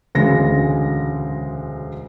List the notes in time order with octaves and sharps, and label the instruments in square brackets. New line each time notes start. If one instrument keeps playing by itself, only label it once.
[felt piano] E1 D2 C#3 G#3 A#6